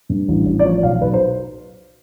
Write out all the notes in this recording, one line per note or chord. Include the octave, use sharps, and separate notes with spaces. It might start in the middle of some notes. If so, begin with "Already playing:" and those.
G2
A1
A1
D5
F3 C#5
B1 F5
B1 B4
C5